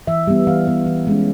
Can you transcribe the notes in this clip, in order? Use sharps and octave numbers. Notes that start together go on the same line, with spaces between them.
E3 E5
G3 B3
E3 F5
G3 B3
E3
G#3 C#4